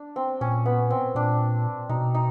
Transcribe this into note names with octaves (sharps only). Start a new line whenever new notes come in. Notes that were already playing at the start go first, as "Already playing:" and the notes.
Already playing: D4
C4
A#2 C#4
B3
C4
A#2 D4
B2 D#4
D#4